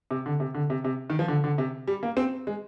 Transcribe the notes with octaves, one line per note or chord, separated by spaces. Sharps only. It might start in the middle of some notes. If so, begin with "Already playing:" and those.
C3
D3
C3
D3
C3
C3
D#3
F3
D3
D3
C3
G3
A#3
C4
G#3